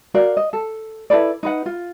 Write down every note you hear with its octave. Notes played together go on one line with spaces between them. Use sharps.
F#4 A#4 D5 F5
D#5
A4
E4 A4 B4 D5
D#4 B4 F#5
F4